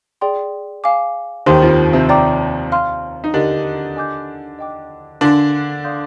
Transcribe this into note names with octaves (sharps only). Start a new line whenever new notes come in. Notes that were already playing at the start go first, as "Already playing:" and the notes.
G#4 D5 G5 C6
F5 G#5 D6
D#2 D#3 G4 C5 G5 C6
F2 F3
C3 C4
D5 G5 A#5 D6
F5 C6 F6
D#4
D3 D4 G4 A#4 D#5
D#5 G#5 D6 G6
D#5 G5 D6
D3 D4 A#4 F5 G#5 C6
D5 F5 C6 D#6 G6